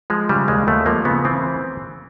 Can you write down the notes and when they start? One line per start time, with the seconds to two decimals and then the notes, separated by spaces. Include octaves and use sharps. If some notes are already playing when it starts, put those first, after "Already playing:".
0.10 F3 G#3
0.29 C#3 G3
0.48 D#2 G#3
0.67 D#2 A3
0.86 F3 A#3
1.05 C#3 B3
1.25 E3 C4